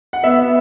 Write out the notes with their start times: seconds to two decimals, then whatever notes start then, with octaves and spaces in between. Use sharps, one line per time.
0.13 F#5
0.23 B3 E5